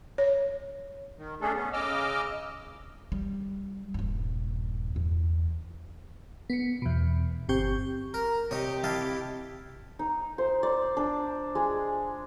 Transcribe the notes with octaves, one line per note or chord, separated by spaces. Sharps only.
C#5
D#3
A3 C#4 D4 G#4 A4
B3 C#4
C#3 D#5 D6 E6 F6
G3
D#1 G2
E2
B3 C#7
E2 B2
G1 C4 G4 C#6 G6
A#4 A#5
C3 D#4 G4 C#5 D#5
E4 D#5 F5 A5
D#4
C5
D5
D4
G#3